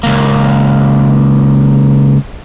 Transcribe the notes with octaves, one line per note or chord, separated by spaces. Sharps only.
C#2 A#3